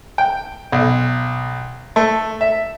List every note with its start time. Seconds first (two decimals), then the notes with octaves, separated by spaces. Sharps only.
0.18 G5
0.72 B1
1.96 A3
2.41 E5